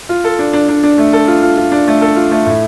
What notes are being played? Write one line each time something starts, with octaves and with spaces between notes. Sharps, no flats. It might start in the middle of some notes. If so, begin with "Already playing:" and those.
F4
A4
D4
D4
D4
D4
A3
A4
F4
F4
F4
D4
A3
A4
F4
A3
A2